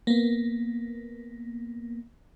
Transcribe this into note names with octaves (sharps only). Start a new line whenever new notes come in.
A#3 B3